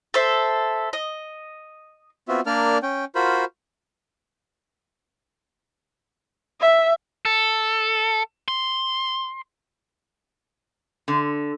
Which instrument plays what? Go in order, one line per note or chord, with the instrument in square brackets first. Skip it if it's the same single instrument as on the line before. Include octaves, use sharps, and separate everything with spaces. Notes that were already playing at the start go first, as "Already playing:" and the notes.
[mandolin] A4 C5 E5
D#5
[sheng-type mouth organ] B3 C4 F4 F#4 E5
A#3 D4 A#4 D5 F6
C#4 G5
F4 F#4 A#4 C5 B5
[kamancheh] E5
[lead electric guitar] A4
C6
[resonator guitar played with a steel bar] D3